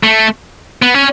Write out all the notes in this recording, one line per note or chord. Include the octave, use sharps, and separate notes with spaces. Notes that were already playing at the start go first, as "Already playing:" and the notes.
A3
B3
C#4